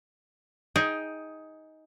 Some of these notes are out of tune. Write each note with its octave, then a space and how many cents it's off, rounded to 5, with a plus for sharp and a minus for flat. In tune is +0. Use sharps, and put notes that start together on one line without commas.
D#4 +15 G#4 +0 G5 +0